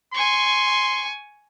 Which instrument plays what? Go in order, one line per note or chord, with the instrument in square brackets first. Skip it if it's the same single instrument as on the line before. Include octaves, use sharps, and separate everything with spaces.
[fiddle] G#5 C#6 [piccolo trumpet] C6